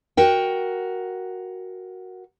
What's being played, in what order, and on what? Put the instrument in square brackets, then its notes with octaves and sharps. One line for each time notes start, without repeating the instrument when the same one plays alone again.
[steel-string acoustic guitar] F#4 A#4 G5